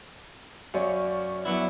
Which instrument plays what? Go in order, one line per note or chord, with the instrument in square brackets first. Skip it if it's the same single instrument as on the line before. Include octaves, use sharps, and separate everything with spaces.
[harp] F#2 [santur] C#5 D5 F5
[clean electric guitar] F#3 B3 E4